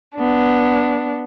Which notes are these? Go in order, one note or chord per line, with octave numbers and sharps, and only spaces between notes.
B3 D4